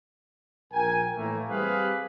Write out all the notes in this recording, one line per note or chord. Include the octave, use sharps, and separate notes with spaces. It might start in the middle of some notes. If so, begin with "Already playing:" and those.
A#1 A#4 G5 G#5
A2 E3 A3 A#3
G3 C4 G4 G#4 B4 F5